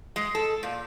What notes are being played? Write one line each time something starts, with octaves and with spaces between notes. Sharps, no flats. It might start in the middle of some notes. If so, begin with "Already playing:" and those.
G#3
A4
A#2